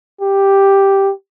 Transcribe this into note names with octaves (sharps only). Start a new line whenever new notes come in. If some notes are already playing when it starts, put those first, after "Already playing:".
G4